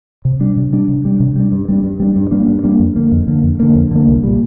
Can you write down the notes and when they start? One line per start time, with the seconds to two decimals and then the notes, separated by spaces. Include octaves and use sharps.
0.25 C3
0.40 G3 D4
0.57 C3
0.73 G3 D4
0.89 C3
1.05 G3 D4
1.20 C3
1.36 G3 D4
1.52 G2
1.69 G3 A#3 D4
1.84 G2
2.00 G3 A#3 D4
2.16 G2
2.31 G3 A#3 D4
2.48 G2
2.64 G3 A#3 D4
2.79 F2
2.96 D3 A#3
3.12 F2
3.27 D3 A#3
3.43 F2
3.60 D3 A#3
3.75 F2
3.91 D3 A#3
4.08 C2
4.23 A#2 G3